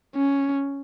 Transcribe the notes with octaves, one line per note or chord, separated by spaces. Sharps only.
C#4